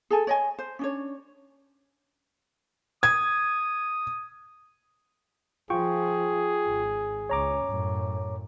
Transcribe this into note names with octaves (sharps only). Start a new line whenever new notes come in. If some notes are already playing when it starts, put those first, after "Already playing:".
G#4 A4 G#5
C#5 D#5 G#5
C5
C#4 D4 C#5
D#6 G#6
F3 F4 G#4 G5 C#6
G#1
C#2 C#4 C#5 A#5 D6
F#2 A2